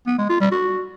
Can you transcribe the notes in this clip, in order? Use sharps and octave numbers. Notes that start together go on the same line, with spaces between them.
B3
G#3
F4
G3
F#4